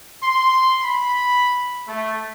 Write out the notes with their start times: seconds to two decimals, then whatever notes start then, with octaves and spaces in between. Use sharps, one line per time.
0.23 C6
0.84 B5
1.88 A3